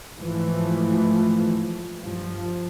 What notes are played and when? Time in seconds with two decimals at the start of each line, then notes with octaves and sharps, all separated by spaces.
0.19 G#2 E3 F3 A3
2.00 G2 F3